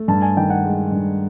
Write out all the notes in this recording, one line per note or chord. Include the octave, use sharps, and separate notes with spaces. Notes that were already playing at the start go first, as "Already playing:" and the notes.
Already playing: A3
G2 A5
G#5
D#3 G5
F#5
G#3
G2